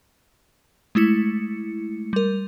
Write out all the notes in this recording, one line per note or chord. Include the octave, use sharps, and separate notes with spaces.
G#3 A3 E4 C#7
G3 A#4